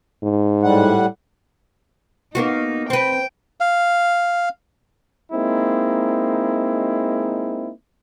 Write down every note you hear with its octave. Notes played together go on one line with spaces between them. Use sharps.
G#2
A2 G3 F#5
A#3 B3 D#4 F#4
C4 B4 G5
F5
G#3 A#3 C4 D#4 E4